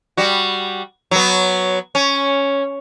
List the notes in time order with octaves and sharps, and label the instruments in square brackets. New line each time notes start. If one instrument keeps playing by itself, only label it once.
[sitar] G3 F#4
F#3 B3
C#4